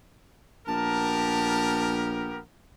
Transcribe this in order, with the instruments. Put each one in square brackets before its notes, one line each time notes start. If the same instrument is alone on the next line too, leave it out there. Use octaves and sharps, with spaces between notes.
[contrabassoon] A#1 [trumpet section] B3 G4 A#4 [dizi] A5